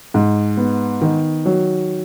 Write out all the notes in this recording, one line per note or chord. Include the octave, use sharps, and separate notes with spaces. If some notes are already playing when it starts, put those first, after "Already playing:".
G#2
B3
D#3
F#3